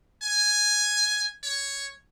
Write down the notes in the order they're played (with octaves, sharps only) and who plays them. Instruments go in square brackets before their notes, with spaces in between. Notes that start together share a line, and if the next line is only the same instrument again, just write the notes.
[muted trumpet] G#5
C#5